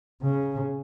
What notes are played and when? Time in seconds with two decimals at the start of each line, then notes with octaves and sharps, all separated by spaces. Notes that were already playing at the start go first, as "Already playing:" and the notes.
0.23 C#3